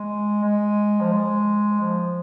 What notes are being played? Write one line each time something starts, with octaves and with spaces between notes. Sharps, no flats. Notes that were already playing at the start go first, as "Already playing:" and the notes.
Already playing: G#3
G#3
F3
G#3
F3